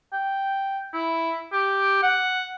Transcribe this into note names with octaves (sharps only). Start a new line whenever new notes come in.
G5
E4
G4
F#5